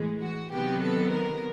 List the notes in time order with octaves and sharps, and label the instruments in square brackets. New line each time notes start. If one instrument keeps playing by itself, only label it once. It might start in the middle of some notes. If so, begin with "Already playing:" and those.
Already playing: [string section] A2 E3 G#3
F#4
C3 D#3 F#3 B3 G4
A4
A#4